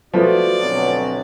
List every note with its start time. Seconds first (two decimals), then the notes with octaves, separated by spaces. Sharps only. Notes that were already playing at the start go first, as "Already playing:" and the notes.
0.14 F3 A3 B3 F#4 D5
0.62 D2 B2 F#3 C4